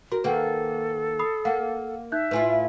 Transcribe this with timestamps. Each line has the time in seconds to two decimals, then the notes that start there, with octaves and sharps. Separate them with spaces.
0.12 F#4 A#4
0.24 D#3 A#3 A4 B4 F#5 G5
1.19 B5 D#6 C7
1.45 A#3 F5 F#5
2.12 D#4 E5 F#6 G6
2.31 A2 E4 F4 B4 G#5